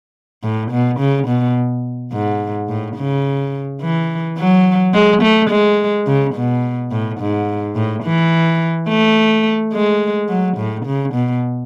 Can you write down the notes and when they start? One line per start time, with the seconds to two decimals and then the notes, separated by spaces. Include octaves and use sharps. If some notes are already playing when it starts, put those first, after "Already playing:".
0.43 A2
0.71 B2
0.99 C#3
1.27 B2
2.12 G#2
2.68 A2
2.96 C#3
3.81 E3
4.38 F#3
4.94 G#3
5.22 A3
5.50 G#3
6.07 C#3
6.35 B2
6.91 A2
7.20 G#2
7.76 A2
8.04 E3
8.88 A3
9.73 G#3
10.29 F#3
10.57 A2
10.85 C#3
11.14 B2